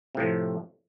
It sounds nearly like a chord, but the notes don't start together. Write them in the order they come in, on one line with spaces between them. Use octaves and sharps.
C3 A2 F3